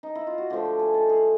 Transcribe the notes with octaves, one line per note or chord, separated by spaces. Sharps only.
D#4
E4
F4
F#4
D3 F3 A3 G4
G4
G#4
A4
G#4